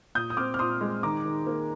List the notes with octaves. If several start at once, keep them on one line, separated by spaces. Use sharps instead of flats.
A#2 D#6 G6
D#6
C4 D6 F6
F6
A#2 C6 D#6
G#3
D#3 A#5 D6
D#3
A#3